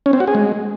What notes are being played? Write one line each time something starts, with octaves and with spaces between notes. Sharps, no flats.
C#4
C4
F#4
G#4
G#3